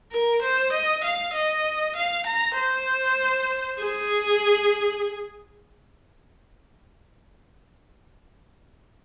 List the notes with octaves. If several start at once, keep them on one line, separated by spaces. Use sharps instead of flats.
A#4
C5
D#5
F5
D#5
F5
A#5
C5
G#4